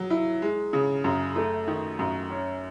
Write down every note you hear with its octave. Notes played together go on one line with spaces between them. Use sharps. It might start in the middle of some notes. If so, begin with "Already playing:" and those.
Already playing: F#3
E4
G#3
C#3
F#2
A3
D#3
F#2
C#4